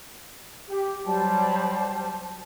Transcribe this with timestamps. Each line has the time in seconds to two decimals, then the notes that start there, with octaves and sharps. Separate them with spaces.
0.70 G4
1.07 F#3 G3 C5 A5